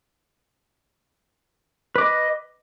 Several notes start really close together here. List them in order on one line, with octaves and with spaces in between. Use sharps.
B4 D6 D#5